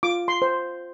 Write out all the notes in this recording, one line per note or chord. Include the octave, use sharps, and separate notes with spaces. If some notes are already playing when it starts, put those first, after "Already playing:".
F4 D6
C6
C5